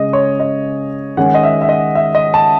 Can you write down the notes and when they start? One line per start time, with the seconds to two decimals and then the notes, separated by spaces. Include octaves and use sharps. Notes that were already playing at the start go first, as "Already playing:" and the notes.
Already playing: C#3 G#3 C#4 D#5
0.13 C#5
0.40 D#5
1.17 D#3 G#3 C#4 F#5
1.34 D#5
1.43 E5
1.62 E5
1.69 D#5
1.95 E5
2.15 D#5
2.34 A5